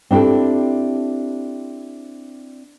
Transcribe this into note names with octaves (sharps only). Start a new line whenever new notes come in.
C4 D4 E4 G4 A4